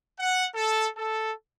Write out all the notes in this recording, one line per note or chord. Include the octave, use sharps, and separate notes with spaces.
F#5
A4
A4